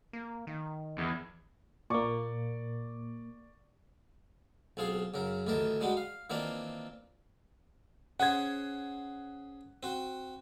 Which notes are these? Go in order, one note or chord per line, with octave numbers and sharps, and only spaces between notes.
A#3
D#3
E2
A#2 A#3 D5 C#6 D6
B1 C4 F4 G#4 F5
F#2 C#3 A#4
A1 D2 D#3 E3 A#4 A5
G3 G#3 D4 F#4 G4
F5
D#3 E3 A#3 C4 D4 F4
C#4 G#4 C5 F#5 G#6
C4 F#4